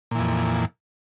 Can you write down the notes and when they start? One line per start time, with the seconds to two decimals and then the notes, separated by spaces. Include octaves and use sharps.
0.11 A#2
0.15 E3
0.19 F2